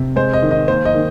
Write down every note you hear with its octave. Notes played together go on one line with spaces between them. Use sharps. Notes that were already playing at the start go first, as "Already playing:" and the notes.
Already playing: C3
G#3 C5
D#5
D#3
D#5
A#3 C5
D#5
D#3